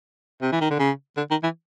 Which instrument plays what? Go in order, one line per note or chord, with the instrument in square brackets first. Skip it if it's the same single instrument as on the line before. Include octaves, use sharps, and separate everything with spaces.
[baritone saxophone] C3
E3
D#3
D3
C#3
D3
D#3
E3